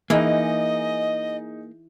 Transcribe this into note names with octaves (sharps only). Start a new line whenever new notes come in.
E3 A#3 D#4 G#4 D#5